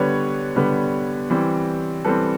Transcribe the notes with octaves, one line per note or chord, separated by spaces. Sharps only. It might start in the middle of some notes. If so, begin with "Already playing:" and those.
Already playing: D3 G3 B3 B4 C#5
D3 G3 B3
E3 G3 C4
E3 G3 C4 A4 B4